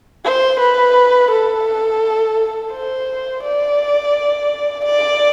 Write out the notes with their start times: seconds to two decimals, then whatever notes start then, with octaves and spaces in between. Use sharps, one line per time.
0.24 C5
0.59 B4
1.31 A4
2.72 C5
3.43 D5
4.85 D5